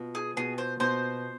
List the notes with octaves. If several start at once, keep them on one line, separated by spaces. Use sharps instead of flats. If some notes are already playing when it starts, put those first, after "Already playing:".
Already playing: B2 F4
G#4
B2 G#4
C5
B2 C5